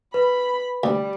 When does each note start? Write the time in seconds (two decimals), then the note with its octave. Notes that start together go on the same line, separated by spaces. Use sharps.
0.14 B4 B5
0.83 D2 G3